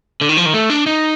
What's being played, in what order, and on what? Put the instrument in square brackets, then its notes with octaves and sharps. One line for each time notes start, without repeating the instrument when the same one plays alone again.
[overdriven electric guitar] D3
D#3
F3
D#3
A3
D4
D#4